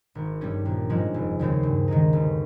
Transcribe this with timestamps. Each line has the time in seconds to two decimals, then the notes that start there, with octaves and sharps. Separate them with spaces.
0.15 G#1
0.41 G2 G3 C#4
0.65 A#1
0.90 G#2 F3 G#3 C#4
1.14 F1
1.39 D#2 C#3 G#3 C4
1.63 G2
1.88 D#3 G#3 D#4
2.13 G1